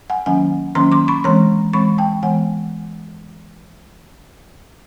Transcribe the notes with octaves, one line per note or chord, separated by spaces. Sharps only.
F#5 G#5
D#3 F#3 A#3 C#4 F#5 G#5
D#3 F#3 A#3 C#4 A#5 C6
C6 D6
B5 C#6
E3 G#3 C4 A#5 C6
E3 G#3 C4 B5 C#6
G5 A5
E3 G#3 B3 F#5 G#5